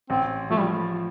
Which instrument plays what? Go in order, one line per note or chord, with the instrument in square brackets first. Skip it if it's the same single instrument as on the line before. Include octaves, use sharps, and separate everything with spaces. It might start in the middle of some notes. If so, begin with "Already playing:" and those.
[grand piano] A1 [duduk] C4
[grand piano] F3 [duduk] A3
[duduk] G3